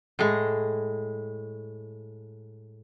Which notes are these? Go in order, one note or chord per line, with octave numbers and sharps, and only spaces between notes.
A2 G#3